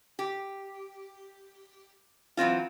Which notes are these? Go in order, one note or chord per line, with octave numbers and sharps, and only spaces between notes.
G4
E3 F#3 C4 F4